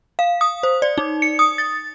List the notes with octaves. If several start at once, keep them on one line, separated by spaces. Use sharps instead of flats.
F5
D#6
C5
D5
D#4
C#7
D#6
A6